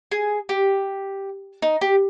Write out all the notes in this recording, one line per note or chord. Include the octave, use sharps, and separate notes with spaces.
G#4
G4
D#4
G4